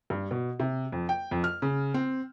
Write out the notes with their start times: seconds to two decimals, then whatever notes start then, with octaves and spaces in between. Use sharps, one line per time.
0.10 G2
0.31 B2
0.60 C3
0.92 F2
1.09 G5
1.31 F2
1.44 F6
1.62 C#3
1.94 C4